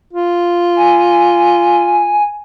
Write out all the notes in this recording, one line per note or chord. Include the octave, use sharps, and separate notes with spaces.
F4
G#5